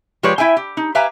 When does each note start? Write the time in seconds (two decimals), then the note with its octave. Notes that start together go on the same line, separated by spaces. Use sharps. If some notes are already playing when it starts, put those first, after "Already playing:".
0.23 F3 G#3 G4 B4 C#5 D5
0.38 E4 E5 G5 G#5
0.57 G4
0.77 D#4
0.95 G4 B4 E5 F5 G#5 A#5